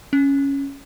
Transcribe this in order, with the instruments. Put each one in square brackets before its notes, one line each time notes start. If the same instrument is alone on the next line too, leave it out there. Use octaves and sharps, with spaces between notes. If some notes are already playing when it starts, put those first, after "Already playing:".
[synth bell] C#4